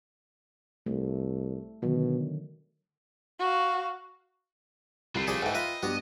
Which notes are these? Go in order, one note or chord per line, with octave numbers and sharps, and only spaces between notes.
C2 A3
B2 D3 D#3 F#3
F#4 F5
C2 D3 A3 C7
F3 G#4 D5 G5
G#2 E3 A4 G5
F4 B4 D#5 E5 A#5
G2 B3 F#4 G4